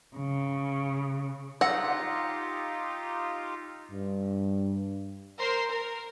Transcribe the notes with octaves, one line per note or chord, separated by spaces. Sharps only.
C#3
D#4 F4 G4 F#5 E6 A#6 C#7
G2
A#4 C5 C6
A#4